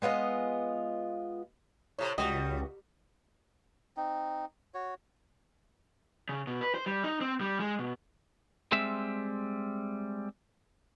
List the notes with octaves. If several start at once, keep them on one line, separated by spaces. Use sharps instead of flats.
G#3 B3 F4 D#5
A2 C3 C#5
C#2 G3 F#4 G4 D#5 G5
C4 D#4
F#4 C#5
C#3
B2
B4
C5
G3
D#4
C4
G3
G#3
B2
G3 G#3 C4 E5